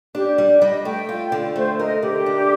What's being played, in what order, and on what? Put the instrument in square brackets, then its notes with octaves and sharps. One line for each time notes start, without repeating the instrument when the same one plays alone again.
[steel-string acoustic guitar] D4 [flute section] G4
[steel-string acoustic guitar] G3
[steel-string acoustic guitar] G3 [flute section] D#5
[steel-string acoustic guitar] A3 [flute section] G5
[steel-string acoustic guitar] F4
D3
[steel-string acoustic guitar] A3 [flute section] C5
[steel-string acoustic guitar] A#4 [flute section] D#5
[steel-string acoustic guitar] D3 [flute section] G4
[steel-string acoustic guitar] D4